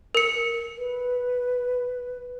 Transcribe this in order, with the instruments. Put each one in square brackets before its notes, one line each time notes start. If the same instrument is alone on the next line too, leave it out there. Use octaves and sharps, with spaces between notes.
[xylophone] A#4 C#7
[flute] B4